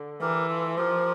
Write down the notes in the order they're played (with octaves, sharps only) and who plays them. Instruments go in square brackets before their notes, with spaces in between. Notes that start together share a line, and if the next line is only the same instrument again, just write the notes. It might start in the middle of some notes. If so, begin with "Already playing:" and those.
Already playing: [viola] D3
[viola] E3 [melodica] G4 A#4
[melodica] F4 A4
[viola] F3 [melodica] G4 A#4